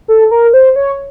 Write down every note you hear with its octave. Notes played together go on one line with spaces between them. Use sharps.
A4
A#4
C5
C#5